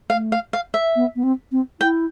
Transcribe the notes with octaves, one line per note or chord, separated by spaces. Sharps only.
A3 F5
F5
F5
E5
B3
B3
C4
C4
E4 G5